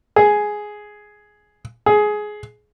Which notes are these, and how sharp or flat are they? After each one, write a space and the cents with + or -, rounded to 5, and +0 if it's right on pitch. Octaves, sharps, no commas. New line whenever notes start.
G#4 +5
G#4 +15